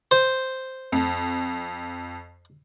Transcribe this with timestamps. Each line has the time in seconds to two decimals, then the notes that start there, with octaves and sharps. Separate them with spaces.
0.11 C5
0.92 F2